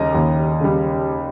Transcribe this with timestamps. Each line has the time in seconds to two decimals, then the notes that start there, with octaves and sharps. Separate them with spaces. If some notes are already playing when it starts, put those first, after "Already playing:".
Already playing: D#2 C#3 G3 D#5 A#5
0.14 D#2
0.61 C#3 G3